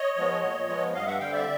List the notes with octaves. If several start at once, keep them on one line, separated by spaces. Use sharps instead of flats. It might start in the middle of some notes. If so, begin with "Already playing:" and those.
Already playing: C#5 D#5
F3 G#3 B3
A#2
F3 G#3 B3
G2 D#5 F5
E5 F#5
D3 G3 C4 F5 G5
D5 E5